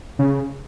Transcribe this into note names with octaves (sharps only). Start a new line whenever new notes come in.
C#3